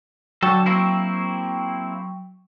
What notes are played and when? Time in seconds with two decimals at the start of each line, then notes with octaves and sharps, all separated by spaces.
0.43 D3 F#3 A4 G5 C#6
0.66 A#3 C4 E4